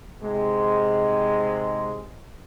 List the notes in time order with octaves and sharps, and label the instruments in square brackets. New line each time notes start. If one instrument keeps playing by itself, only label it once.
[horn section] G#2 C3 G#3